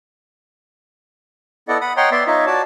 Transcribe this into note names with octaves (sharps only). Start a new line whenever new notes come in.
B3 E4 A4 D5 D#5 F#5
F#5 B5 D#6
C#5 D#5 F#5 G5 A#5 C6
B3 D5 E5 C6
D#4 F4 C#5 D#5 E5
F#4 C#5 D5 A5